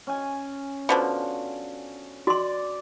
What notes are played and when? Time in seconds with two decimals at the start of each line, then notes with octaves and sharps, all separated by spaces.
0.07 C#4 G#5
0.89 B2 D3 F3
2.27 F#4 D5 C6